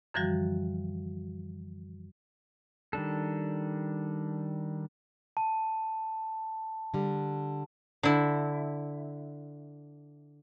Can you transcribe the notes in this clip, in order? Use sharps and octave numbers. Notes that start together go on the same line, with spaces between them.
F#2 D3 E3 F3 G3 F#4
D#3 G3 D4 A4
A5
D3 G3
D3 E4